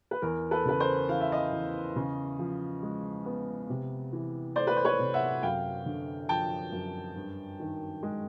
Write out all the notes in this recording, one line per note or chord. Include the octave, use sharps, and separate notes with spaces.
B4
E2 A#4
A4 B4
C#3 B4
A#4 C5
E3 F5
E5
D#5 F5
E2
C#3
F3
G#3
B3
C3
E3
A3 C5 D5
B4
C5
B4 C#5
C3
E5 F#5
F#2 F5 G5
D3
F3 G5 A5
F#2
G2
D#3
G#3